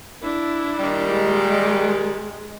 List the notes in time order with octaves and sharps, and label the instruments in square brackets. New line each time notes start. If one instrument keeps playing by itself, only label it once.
[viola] D4 E4
[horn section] A#2 D#3 G3
[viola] G#3